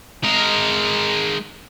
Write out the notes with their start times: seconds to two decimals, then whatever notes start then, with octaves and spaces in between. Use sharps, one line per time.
0.24 G#3 A#4